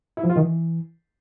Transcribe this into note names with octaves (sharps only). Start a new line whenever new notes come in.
E4
F3
F4
D#3
E3